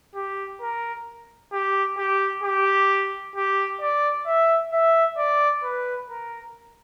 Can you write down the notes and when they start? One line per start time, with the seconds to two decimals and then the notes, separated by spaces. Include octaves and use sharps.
0.15 G4
0.61 A#4
1.52 G4
1.98 G4
2.43 G4
3.36 G4
3.81 D5
4.26 E5
4.72 E5
5.17 D5
5.63 B4
6.10 A#4